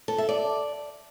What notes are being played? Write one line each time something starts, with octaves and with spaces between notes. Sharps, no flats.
A4
E5
D5